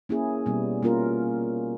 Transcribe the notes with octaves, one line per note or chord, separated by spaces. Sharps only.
A#3 C#4 E4 G#4
B2 G3 B3
G3 A#3 C#4 F4 A#4